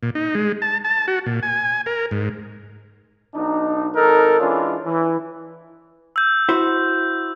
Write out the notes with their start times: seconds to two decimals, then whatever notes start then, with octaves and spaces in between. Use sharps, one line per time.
0.03 A#2
0.15 D#4
0.35 G#3
0.62 A5
0.85 A5
1.08 F#4
1.26 A#2
1.43 G#5
1.86 A#4
2.11 G#2
3.34 B1 D4 D#4
3.95 G#1 D#4 A4 A#4
4.40 E3 G#3 C#4 D4 F4
4.85 E3
6.16 E6 G6
6.49 E4 F#4 C5